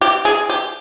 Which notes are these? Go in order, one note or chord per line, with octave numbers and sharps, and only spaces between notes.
G4
G#4
G4